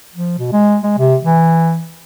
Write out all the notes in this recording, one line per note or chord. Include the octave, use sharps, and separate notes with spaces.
F3
B2
G#3
G#3
C3
E3